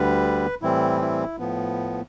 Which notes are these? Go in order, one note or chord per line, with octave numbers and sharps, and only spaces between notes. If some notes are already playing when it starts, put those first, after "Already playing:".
Already playing: D2 D3 G3 B4
A2 E3 G3 C4 E4
E4
A2 F3 B3